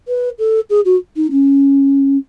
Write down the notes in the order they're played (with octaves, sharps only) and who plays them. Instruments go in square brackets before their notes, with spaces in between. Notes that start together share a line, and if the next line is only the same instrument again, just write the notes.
[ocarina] B4
A4
G#4
F#4
D#4
C#4